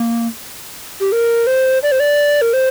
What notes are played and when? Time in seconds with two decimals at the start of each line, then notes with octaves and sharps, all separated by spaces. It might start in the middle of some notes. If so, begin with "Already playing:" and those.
Already playing: A#3
1.00 G4
1.12 A#4
1.47 C5
1.83 D5
1.92 C5
2.00 D5
2.41 A#4
2.53 C5